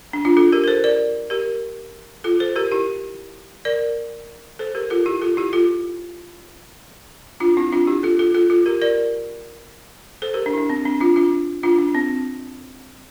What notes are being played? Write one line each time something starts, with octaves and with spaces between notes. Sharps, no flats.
D4
D4 F4
F4 A4
G4 A#4
A#4
A4 C5
A#4 D5
G4 A#4
F4 A4
A4 C5
G4 A#4
E4 G4
A#4 D5
A4 C5
G4 A#4
F4 A4
E4 G4
F4 A4
E4 G4
F4 A4
D4 F4
C4 E4
D4 F4
E4 G4
F4 A4
F4 A4
F4 A4
F4 A4
G4 A#4
A#4 D5
A4 C5
G4 A#4
D4
E4
D4
C4
D4
D4 F4
D4 F4
D4 F4
D4
C4